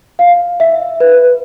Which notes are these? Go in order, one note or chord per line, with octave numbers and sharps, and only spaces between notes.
F5
E5
B4